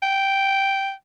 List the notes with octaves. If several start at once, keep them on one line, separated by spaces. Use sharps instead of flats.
G5